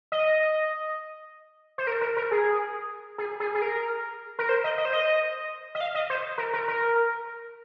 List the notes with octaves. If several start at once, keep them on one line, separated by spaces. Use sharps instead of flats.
D#5
C5
A#4
A#4
A#4
G#4
G#4
G#4
G#4
A#4
A#4
C5
D#5
D#5
C5
D#5
D#5
F5
D#5
C5
A#4
A#4
A#4